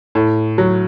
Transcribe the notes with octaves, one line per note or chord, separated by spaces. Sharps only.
A2
F#3